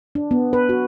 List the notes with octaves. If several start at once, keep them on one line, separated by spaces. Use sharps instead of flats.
D4
B3
B4
F#4